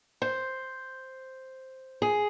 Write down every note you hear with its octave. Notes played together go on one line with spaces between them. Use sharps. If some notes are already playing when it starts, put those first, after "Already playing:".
C5
G#4